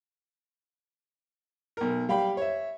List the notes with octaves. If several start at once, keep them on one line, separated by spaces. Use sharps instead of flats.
B1 A#4
G3 F5 G5 B5
C#5 E5